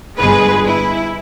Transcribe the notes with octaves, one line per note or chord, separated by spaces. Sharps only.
G1 G#3 G#4 B4
E4